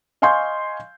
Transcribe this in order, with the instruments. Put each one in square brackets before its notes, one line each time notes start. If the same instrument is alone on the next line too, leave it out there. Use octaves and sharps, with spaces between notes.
[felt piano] D#5 F5 G#5 C6 C#6 G6